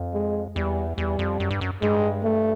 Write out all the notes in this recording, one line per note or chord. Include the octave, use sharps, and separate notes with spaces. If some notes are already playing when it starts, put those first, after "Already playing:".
Already playing: F2
G#3
E2 G3
E2 G3
F2
F#2
G2
F#2
G2 G#3
A3